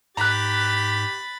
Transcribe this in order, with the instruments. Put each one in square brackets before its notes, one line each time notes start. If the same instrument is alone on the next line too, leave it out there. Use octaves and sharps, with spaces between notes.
[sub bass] G#2 [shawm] G4 [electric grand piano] A#5 F#6 [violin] B5 A6